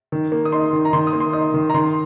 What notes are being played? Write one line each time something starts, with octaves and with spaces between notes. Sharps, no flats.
D#3
A#3
D#6
D#4 C6
D#3
A#5
D#3 C6
D#6
A#3
C6
D#4 D#6
D#3
A#5
D#3 C6